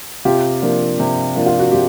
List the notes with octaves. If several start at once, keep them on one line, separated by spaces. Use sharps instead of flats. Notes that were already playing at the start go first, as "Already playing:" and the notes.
C3 F4 G4
F3 A#3 D4
C3
F3 A#3 D4
F4
F#4
C3 F4 G4